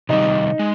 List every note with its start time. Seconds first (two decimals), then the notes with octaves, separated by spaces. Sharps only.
0.09 C3 D#3 G3 D#4
0.59 G#3